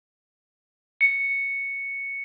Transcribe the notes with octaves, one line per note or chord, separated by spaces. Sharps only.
C#7